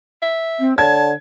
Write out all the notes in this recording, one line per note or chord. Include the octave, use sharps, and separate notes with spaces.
E5
C4
D3 C#5 A5 G#6